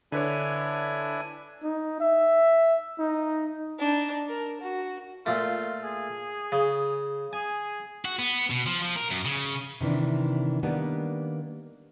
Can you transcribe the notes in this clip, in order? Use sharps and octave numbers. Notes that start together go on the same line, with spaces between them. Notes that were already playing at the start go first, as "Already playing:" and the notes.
D3 D4 E4 B4 C#5 G#5
D#4
E5
D#4
D4 D#4
A#4
F#4
A#2 A3 F4
G#4
C#3
G#4 G#5
F#4
B3
B2
F3
F3
A#4
F#2
C#3
C3 D#3 E3 D4
D#3 G3 A#3 B3 D4